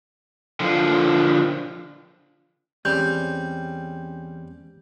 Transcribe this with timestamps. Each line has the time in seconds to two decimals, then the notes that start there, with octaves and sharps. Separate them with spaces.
0.60 D3 F3
2.85 E2 G3 C4 C#4 G#4 G6